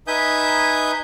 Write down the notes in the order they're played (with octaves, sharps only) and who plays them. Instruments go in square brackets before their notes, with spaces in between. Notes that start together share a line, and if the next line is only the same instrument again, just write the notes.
[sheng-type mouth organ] D#4 B4 E5 G#5 D#6 G6